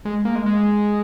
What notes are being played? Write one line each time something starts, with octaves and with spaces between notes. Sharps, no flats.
G#3
A#3
G#3
G#3